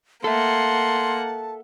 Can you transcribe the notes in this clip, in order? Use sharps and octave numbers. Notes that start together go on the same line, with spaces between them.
A#3 A4 E5 F#5 A5 C6